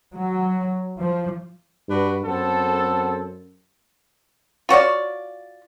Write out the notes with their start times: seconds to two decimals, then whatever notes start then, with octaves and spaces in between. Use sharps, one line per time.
0.14 F#3
1.00 F3
1.88 G2 D4 F#4 B4
2.26 F#2 B3 C4 A4
4.69 F4 F#4 C#5 D5